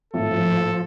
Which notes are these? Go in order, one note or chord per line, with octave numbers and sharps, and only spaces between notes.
G#1 A2 F3 A#3 A4